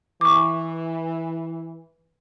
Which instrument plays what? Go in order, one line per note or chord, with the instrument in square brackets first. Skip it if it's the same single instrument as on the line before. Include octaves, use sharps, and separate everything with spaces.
[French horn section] E3 [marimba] C#6 D6